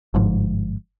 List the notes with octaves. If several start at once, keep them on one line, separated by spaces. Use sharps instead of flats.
G1 G#2 F3